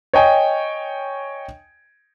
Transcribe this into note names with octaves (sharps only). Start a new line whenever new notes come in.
C#5 D#5 G5 G#5